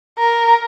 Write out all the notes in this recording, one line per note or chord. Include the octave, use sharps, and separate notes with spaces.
A#4